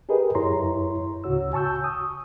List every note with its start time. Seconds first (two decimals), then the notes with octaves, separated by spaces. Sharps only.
0.09 G4 G#4 A#4 B4 D#5 G5
0.35 F#2 E4 C#5 A#5 C6
1.24 D2 A2 C#3 F#4 C#5 E6
1.53 G#5 A5 C#6 E6 G6
1.84 D#6